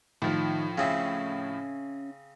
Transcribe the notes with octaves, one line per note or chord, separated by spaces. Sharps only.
A2 D#3 F3
C#3 C4 C#4 E5